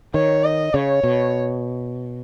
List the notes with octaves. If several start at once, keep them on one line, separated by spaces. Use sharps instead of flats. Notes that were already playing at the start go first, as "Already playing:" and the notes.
D#3 C#5
D#5
C#3 C#5
B2